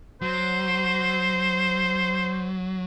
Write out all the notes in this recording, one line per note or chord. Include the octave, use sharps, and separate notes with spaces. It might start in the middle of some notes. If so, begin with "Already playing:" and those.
F#3 C5